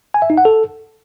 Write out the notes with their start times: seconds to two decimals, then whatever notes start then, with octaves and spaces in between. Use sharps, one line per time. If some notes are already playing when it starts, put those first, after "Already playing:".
0.14 G#5
0.22 E5
0.30 D#4
0.38 F#5
0.45 A4